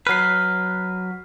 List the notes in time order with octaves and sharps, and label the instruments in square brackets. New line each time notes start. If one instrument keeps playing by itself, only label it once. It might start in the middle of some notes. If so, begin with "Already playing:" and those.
[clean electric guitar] F#3 B4 [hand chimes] F6 C7